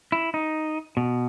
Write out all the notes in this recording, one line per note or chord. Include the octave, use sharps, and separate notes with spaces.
E4
D#4
B2